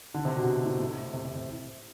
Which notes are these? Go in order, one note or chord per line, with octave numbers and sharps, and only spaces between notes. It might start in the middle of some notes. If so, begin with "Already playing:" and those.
D3
C3
B2
A2
A2
C3
C3
C3